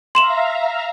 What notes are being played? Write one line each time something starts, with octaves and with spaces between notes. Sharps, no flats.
E5 F5 A#5 C6 E7 F#7